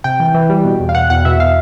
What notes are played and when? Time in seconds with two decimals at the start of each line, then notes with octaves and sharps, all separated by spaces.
0.04 C3 G5
0.20 E3
0.34 E3
0.50 G3
0.65 B2
0.80 E2
0.89 F5
0.95 B2 F#5
1.10 E2 F#5
1.25 B2 E5
1.40 B2 F5